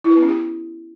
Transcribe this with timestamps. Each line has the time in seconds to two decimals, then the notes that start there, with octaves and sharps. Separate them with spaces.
0.04 E4
0.10 B4
0.16 B3
0.23 C#4
0.29 G4